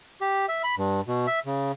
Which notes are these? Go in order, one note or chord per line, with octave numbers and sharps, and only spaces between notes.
G4
E5
B5
G2
B2
E5
C#3